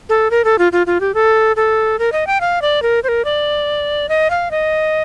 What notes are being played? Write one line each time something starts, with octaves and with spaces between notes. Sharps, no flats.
A4
A#4
A4
F4
F4
F4
G4
A4
A4
A#4
D#5
G5
F5
D5
A#4
C5
A#4
D5
D#5
F5
D#5